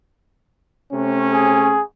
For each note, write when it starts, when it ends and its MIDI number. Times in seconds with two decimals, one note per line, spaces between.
0.93 1.78 48
0.93 1.78 57
0.93 1.78 61
1.33 1.82 68